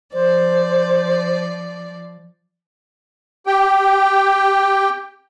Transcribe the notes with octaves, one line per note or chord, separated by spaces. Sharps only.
F3 C5 D5
G4 G5